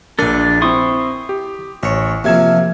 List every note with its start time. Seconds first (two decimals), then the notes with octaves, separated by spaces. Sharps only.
0.19 A#1 D4 A4 A#4 G#5
0.62 C4 E4 C6 C#6 D#6
1.29 G4
1.83 A1 C#5 C#7
2.24 C3 F3 A#3 G#6 E7